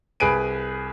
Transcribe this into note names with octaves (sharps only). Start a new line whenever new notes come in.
C2 G#4 B4 G#5 D7 D#7